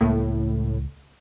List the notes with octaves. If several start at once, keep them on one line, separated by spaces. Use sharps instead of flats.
C#2 A2 G#3 A#3